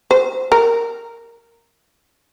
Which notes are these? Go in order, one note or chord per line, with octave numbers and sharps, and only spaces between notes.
C5
A#4